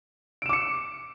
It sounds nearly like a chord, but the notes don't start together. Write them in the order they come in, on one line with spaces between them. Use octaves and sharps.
D7 E7 D6 C#7